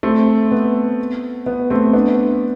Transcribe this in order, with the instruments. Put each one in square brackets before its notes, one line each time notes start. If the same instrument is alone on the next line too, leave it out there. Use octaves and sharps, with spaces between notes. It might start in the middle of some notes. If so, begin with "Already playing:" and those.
[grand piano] A3 C4
B3
B3
A3 C4
B3 D4